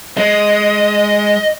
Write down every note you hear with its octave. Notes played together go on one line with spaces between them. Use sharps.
G#3 D#5